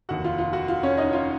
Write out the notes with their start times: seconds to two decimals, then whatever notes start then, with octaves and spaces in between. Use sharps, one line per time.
0.09 F1 D#2 D#3 F#4 F#5
0.24 F4 F5
0.38 F4 F5
0.53 F#4 F#5
0.68 F4 F5
0.83 C#4 C#5
0.97 D#4 D#5
1.13 F4 F5